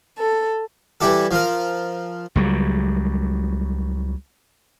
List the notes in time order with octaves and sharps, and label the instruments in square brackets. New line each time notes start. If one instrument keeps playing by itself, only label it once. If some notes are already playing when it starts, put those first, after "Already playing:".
[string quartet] A4
[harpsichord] E3 G3 E4 G4 A4
F3 F4 A#4
[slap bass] C#2 F#3 G3